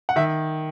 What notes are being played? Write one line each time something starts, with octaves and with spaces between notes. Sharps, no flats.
F#5
D#3 E5